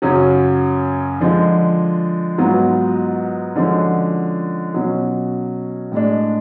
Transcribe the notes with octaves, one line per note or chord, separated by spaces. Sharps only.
F#2 C#3 F#3 C#4
D3 F3 G#3
G#2 F#3 B3 F4
D3 F3 G#3 C#4 F#4
B2 F#3 C#4
A2 G#3 D4